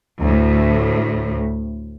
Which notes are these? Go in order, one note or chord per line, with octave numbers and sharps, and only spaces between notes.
D2 A2